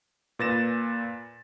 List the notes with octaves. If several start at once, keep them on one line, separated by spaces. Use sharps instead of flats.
A#2 B4 A6 A#6 E7